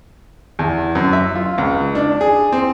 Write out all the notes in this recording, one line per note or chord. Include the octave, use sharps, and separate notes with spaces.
E2
F#2
E5
F4
C#2
D4
G#4
C4